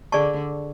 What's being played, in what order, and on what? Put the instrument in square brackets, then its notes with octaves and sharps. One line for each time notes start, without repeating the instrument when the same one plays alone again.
[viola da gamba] D3 [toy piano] G#4 D5 A5 C#6